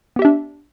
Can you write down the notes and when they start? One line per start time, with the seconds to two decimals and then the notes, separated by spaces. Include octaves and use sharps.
0.16 B3
0.19 G4
0.22 E5
0.25 D4